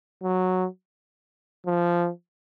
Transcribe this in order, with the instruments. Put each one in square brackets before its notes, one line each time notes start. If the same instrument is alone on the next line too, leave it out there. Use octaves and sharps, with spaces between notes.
[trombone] F#3
F3